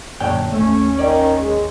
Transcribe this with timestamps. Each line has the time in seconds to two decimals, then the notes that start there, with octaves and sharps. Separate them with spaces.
0.20 F#2 A#2 D3 D4 C#5 G5
0.52 G#1 D#2 A3 C#4
0.99 D#3 D5
1.38 G#3